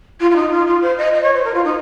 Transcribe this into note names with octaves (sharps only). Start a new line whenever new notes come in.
F4
F4
D#4
F4
F4
C5
D#5
D#5
C#5
C5
A#4
F4
D#4